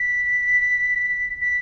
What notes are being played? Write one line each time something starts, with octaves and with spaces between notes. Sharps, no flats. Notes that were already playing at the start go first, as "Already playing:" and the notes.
Already playing: B6
B6